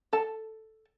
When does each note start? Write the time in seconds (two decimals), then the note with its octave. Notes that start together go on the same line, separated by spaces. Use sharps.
0.13 A4 A5